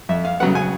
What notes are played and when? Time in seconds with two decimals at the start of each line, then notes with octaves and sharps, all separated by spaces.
0.09 F2 E5
0.25 F5
0.40 C#3 F#3 B3 F#5
0.55 G#5